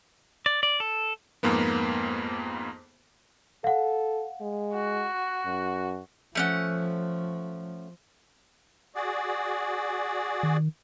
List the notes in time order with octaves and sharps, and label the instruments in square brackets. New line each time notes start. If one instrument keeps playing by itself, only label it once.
[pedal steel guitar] D5
D5
A4
[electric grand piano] F2 G#2 A#3 B3
[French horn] A4 [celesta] F5 F#5
[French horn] G#3
[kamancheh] F#4
[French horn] F#2
[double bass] F3 [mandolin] A3 C#4 F#5
[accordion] F#4 G#4 D5
[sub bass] D#3